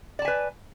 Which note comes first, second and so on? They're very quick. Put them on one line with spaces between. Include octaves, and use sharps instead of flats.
D5 A5 G#5 B4